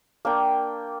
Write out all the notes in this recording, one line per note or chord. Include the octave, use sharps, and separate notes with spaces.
A#3 D4 G5